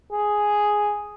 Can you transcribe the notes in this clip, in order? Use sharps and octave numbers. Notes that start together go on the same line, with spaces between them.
G#4